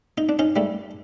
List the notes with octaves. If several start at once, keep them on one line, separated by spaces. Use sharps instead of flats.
D#4
D4
C#4 D#4
G3 A3